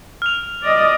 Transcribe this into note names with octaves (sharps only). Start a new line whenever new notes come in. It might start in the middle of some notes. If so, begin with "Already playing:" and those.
F6 F7
D5 D#5